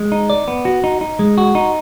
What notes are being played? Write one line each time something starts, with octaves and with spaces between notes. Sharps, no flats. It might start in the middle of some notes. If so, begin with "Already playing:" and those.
Already playing: G#3
D#4
D5
B3
F#4
D#4
D#4
G#3
F#4
D#4